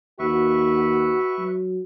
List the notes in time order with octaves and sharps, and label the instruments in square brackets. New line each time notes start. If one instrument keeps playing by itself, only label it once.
[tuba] D#2 [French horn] F#4 [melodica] B4 E5 C#6
[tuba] F#3